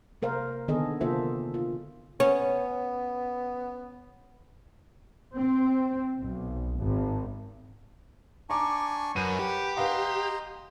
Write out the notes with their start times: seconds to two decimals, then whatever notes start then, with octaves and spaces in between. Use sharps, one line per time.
0.22 C3 A#3 A#4 C5 F5
0.68 D3 D#3 B3 G#4 A4 D#5
1.01 C3 A#3 F4 A4 C5 E5
1.54 F4
2.20 B3 C#4
5.36 C4
6.19 B1
6.78 G#1
8.50 D4 G#5 A#5 C#6 D6
9.16 F#2 B4 F#5 D#7
9.39 G4
9.77 B4 D#5 F5 F#5 A#5 C6